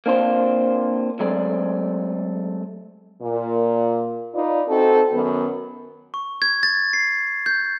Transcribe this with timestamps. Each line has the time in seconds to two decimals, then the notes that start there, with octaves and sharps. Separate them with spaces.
0.06 A#3 C4 D4 F4 C5
1.20 F#3 G#3 A3 C4 D5
3.22 A#2
4.34 D#4 F4 B4 D5
4.68 C4 D#4 F#4 A4
5.12 F#2 D#3 B3
6.14 C#6
6.42 G#6
6.63 A6
6.93 C7
7.46 G6